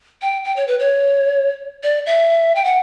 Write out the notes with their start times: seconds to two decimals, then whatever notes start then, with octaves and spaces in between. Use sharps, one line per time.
0.22 G5
0.45 G5
0.56 C#5
0.68 B4
0.79 C#5
1.83 D5
2.06 E5
2.56 G5
2.65 F#5